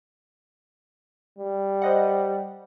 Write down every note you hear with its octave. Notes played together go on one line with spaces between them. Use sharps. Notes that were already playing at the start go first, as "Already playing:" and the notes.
G3
C5 D#5 F#5